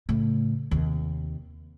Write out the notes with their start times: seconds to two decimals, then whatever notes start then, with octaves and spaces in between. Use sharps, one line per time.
0.09 A2 C#3
0.71 D#2 C3